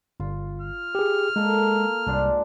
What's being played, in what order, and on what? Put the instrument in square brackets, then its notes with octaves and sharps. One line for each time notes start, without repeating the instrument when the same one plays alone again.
[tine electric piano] G1 [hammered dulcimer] F4
[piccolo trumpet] F6
[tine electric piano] G4 G#4
[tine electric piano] G#3 [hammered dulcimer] A#3 A4
[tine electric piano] C2 [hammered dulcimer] G#2 D4 F4